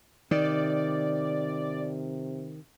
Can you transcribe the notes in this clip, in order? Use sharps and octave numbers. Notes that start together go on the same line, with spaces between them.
C3 D#3 D5